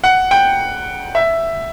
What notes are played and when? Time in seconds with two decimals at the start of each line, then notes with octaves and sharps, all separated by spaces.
0.04 F#5
0.31 G5
1.15 E5